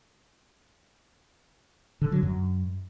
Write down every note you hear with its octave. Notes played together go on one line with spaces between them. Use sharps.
D3
F#3
F#2